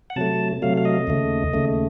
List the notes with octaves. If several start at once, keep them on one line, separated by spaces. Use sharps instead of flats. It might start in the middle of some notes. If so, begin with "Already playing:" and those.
F#5
C3 F#3 A3 A5
C3 F#3 A3 F5
F5
D#5
D#2 C#3 A3
D#2 C#3 A3